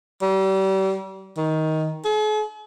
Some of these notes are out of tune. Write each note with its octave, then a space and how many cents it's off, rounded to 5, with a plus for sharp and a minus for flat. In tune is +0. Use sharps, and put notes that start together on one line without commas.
G3 -35
D#3 +15
G#4 +45